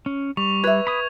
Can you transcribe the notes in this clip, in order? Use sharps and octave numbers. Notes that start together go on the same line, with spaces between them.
C#4
G3 C#6 F7
B4 E5 G#6
B5 D#6